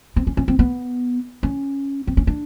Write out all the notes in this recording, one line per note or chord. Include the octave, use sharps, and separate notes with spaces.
C4
C#4
C#4
C4
B3
C#4
C4
C#4
D4